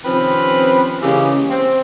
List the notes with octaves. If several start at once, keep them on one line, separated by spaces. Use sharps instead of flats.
C3 D#3 F3 C4 C#4 B4
C#3 E3 G#3 A#3 C#4 G4
C4